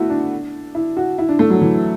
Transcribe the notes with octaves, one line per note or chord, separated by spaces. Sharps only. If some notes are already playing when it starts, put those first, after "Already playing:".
Already playing: A3 B3 E4 F#4
D4
E4
F#4
E4
D4
A3
F#3
E3